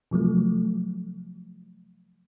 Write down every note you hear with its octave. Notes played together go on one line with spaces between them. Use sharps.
C3 F3 F#3 A3